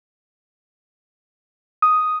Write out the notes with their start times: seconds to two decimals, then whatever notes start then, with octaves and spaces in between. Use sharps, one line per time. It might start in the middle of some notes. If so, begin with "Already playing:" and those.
1.82 D#6